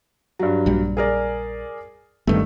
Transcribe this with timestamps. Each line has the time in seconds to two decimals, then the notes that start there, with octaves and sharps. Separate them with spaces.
0.39 G2 F#3
0.66 A#1 G3
0.97 G#4 A#4 D5
2.27 G1 G2 D#3 A3